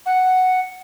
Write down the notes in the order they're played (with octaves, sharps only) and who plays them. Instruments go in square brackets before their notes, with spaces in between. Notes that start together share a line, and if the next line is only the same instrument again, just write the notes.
[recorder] F#5